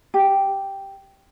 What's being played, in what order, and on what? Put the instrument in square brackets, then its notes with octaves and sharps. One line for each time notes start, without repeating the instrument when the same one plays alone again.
[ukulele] G4